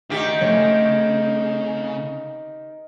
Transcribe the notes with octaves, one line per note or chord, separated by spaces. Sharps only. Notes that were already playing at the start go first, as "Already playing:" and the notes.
D#3 D4 F#4 G4 E5
C#3 A3 C4 C#5